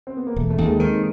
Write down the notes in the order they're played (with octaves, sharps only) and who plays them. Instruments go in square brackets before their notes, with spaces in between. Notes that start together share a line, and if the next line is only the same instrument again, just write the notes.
[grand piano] C4
B3
A#3
[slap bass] E1 [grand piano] A3
[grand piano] A3
[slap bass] D#2
[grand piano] G#3 A#3
[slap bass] D#3 [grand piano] A#3 C4